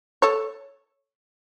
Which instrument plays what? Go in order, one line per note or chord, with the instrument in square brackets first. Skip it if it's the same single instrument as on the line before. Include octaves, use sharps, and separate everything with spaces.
[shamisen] A4 C#5